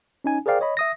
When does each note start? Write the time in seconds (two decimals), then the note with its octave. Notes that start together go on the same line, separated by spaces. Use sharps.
0.24 C#4 D#4 G#5
0.46 G#4 A#4 C5 D5 F5 G5
0.61 C#5 D#5 B5
0.77 E5 D#6 A#6